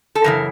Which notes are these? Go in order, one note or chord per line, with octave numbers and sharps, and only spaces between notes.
A4
F#2 C#3 E3 A#4